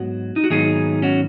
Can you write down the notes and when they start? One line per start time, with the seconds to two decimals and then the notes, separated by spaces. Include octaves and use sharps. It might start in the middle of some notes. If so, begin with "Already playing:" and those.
Already playing: G#2 F#3 B3 F#4
0.36 D#4
0.44 F#4
0.50 G#2 D#3 F#3 B3 D#4 G#4
1.02 C#4 F#4